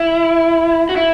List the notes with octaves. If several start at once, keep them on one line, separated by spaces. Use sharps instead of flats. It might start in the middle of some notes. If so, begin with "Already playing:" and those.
Already playing: E4
F#4
E4